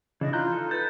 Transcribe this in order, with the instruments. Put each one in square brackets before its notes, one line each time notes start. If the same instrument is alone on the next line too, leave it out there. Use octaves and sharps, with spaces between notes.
[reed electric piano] C#3 [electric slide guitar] E3 D4 E4 [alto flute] D#5
[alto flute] F4 [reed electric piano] A#5 F#6 G6
[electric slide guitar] D#4 A4
[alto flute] B4 [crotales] G6 A6